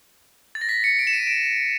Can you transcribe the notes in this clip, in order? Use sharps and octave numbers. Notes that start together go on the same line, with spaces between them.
A6
A#6
B6
C#7
D7
E7
D#7
D7